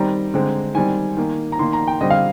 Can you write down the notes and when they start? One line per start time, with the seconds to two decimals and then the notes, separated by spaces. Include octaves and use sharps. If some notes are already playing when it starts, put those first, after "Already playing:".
Already playing: D#3 G3 C4 A#5
0.34 D3 G#3 C4
0.75 D#3 G3 C4 G#5
1.17 D#3 A#3
1.52 A#5
1.59 D#3 A#3 C6
1.73 A#5
1.88 G5
2.01 D3 G3 C4 D#5
2.10 F5